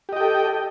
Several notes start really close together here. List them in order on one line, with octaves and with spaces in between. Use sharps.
G4 D#5 G5 A4